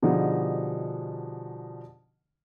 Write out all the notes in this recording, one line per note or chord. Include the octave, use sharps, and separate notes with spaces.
B2 D3 F3 G3 D#4 G#4